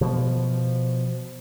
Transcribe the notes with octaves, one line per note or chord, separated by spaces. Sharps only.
B2 F3